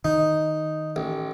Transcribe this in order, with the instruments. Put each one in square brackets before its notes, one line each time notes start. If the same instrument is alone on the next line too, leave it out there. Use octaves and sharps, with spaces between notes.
[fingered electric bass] D#3 [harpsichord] D#4
[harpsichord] A1